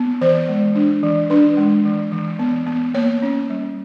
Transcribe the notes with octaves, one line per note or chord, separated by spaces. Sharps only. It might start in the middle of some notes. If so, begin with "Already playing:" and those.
Already playing: B3
E3 C5
G#3
D4
E3
D4 B4
G#3
E3
E3
B3
B3
A#3 C#5
C#4
G3